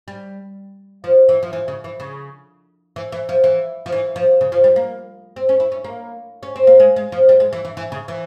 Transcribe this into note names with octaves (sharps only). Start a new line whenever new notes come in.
G3
F3
E3
F3
E3
C#3
E3
C#3
E3
E3
F3
E3
F3
E3
F3
C#3
F3
G3
A#3
C4
C#4
E4
C#4
A#3
C#4
C4
A#3
G#3
G#3
F3
G3
G#3
E3
E3
E3
C#3
E3